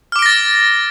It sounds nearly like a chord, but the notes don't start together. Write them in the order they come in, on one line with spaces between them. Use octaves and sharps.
F6 D6 D7 A#6 A6